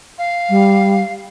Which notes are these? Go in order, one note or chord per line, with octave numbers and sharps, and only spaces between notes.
F5
G3